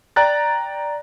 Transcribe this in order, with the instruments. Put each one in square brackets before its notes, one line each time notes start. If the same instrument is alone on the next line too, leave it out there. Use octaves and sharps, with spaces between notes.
[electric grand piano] D5 G5 A#5 F#6 A6